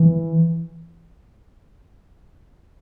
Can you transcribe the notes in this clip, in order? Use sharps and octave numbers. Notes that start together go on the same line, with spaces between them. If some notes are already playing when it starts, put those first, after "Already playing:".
Already playing: E3